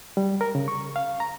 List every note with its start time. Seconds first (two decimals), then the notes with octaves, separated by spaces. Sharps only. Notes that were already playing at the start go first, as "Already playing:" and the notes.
0.17 G3
0.41 A#4
0.55 C#3
0.68 C#6
0.96 F5
1.20 A#5